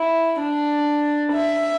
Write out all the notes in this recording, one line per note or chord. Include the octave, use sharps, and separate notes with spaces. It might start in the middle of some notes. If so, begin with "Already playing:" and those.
Already playing: E4
D4
E5